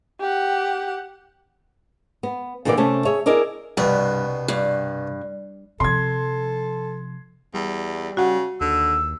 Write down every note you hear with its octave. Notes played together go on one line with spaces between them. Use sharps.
G4 F#5
B3
A#2 D3 E3 A#3 B3 D5
C3 A3 C#4 A4
G#4 C#5 E5
E4 G#4 A#4 D5 D#5
C2 G2 B2 B4
G2
C3 F3 A4 C6 G#6
E2 G3
C#3 F#4 F#5
D#2 D3 E6